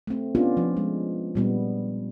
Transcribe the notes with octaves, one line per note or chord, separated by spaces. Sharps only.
A3 C4
B3 C#4 D4 F4 G4
F3
G#3
A#2 G3 B3